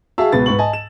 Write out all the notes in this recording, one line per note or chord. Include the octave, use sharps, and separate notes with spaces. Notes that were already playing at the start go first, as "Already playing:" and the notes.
F#4 G#4 E5 F5 A5 E6
C#2 B2 B4 A6
G#2 B4 C#6 F#7
D#5 G#5 A5
E7